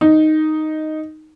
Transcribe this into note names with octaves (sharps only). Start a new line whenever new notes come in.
D#4